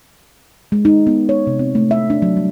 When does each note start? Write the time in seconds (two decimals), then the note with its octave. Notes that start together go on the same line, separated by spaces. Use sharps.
0.72 G#3
0.85 D#4
1.07 B3
1.29 C#5
1.47 C3
1.59 C4
1.75 A3
1.91 E5
2.10 D4
2.22 F#3
2.37 G3